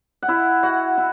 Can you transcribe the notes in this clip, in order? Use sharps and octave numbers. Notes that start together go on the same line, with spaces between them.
F#5
E4 E5
F#4 F#5
E4